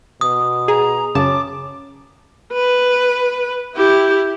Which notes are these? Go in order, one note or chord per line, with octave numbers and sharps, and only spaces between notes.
B2 D#6
G#4 A#5
F#2 C#3 C#4 A5 D6
B4
E4 G4